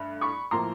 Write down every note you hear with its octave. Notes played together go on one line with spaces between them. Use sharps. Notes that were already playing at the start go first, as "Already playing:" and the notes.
Already playing: G2 A3
B5 C#6
A2 F3 A#3 A#5 C6